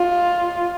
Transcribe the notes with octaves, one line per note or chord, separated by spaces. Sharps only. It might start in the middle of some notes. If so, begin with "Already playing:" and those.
Already playing: F4